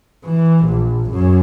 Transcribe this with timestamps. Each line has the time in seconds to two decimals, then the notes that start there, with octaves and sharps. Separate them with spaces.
0.24 E3
0.65 A#1
1.10 F#2